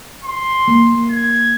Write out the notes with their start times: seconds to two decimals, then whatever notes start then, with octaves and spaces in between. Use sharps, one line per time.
0.24 C6
0.68 A#3
1.10 G#6